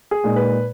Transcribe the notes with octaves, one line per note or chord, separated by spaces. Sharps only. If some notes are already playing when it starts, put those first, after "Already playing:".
G#4
A#2 G#3 D#4
B4